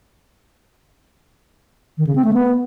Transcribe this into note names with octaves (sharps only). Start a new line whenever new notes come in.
D#3
C#3
C4
A3
B3